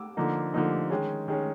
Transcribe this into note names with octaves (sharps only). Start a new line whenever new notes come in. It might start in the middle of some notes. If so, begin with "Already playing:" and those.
Already playing: D6 E6
D3 F3 A#3 D#4
D3 F3 A#3 D#4
D#3 G#3 C#4
D#3 G#3 C#4